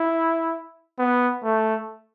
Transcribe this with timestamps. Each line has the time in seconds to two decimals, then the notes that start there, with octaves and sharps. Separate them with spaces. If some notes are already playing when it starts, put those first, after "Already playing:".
Already playing: E4
0.99 B3
1.44 A3